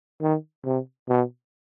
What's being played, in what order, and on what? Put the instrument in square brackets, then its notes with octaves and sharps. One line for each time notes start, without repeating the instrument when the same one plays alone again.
[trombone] D#3
C3
B2